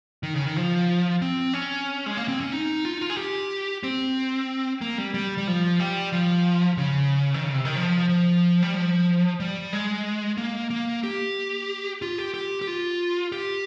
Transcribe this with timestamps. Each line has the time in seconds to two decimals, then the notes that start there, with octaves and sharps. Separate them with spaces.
0.23 D#3
0.34 C#3
0.45 D#3
0.56 F3
1.22 C4
1.54 C#4
2.06 G#3
2.17 A#3
2.28 C4
2.40 C#4
2.52 D#4
2.85 F4
2.94 D#4
3.01 F4
3.10 G#4
3.17 G4
3.83 C4
4.81 A#3
4.98 G3
5.14 G3
5.38 G3
5.47 F3
5.79 G3
6.13 F3
6.77 C#3
7.34 D#3
7.44 C#3
7.54 C3
7.65 D#3
7.76 F3
8.09 F3
8.63 G3
8.74 F3
9.40 G3
9.73 G#3
10.37 A#3
10.70 A#3
11.03 G4
12.02 F4
12.18 G4
12.34 G4
12.62 G4
12.67 F4
13.32 G4